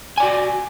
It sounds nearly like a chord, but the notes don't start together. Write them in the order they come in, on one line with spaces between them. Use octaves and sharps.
G#5 D5 F#4